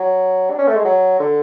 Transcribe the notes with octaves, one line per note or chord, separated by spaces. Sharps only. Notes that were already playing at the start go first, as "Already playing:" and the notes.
Already playing: F#3
D4
C#4
A3
G#3
F#3
D3